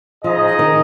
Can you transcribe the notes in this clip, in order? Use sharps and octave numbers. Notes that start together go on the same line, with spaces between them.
F3 D#4 G#4 D#5
D#3